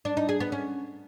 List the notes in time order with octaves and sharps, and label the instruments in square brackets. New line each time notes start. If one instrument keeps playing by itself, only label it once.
[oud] D4
D#4
G#4
B3
C#4